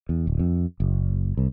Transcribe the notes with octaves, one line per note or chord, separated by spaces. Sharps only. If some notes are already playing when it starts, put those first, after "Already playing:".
E2
D1
F2
F#1
C2